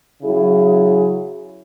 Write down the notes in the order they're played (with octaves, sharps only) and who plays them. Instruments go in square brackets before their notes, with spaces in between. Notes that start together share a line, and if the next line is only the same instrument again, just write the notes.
[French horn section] C#3 F#3 E4 G#4